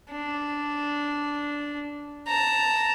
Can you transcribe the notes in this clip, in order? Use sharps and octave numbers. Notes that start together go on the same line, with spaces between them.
D4
A5 A#5